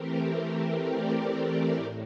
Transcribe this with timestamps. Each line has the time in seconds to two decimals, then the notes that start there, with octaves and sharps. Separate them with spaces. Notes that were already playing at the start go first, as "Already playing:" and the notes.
Already playing: E3 A3 C4 G4 A#4
0.83 A#4 D5
1.75 A2